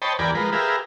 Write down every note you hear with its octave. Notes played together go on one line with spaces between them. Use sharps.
C5 C#5 D#5 G5 A5 B5
E2 G4 A#4 D5 G#5 B5
F3 G#3 A#4 B4
G4 G#4 A#4 B4 E5 F5